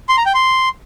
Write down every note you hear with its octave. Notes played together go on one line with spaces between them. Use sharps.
C6
A#5
G5
C6